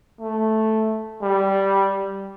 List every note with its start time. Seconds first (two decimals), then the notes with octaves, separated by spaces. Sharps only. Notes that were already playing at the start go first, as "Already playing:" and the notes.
0.21 A3
1.22 G3